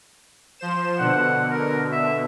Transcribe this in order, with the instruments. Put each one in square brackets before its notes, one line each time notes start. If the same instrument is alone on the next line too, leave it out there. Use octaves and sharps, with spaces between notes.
[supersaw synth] F3 C5 E7
[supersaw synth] B2 D3 [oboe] F#5
[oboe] A#4
E5